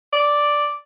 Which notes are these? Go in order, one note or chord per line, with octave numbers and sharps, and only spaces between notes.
D5